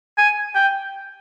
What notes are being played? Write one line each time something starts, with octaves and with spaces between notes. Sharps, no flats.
G#5
G5